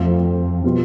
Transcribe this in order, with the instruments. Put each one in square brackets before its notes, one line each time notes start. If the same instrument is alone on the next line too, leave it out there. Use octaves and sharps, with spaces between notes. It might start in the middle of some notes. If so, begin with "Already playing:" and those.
Already playing: [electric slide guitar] F2 [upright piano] F3 A3 C4 F4
[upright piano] B2 G3 B3 F4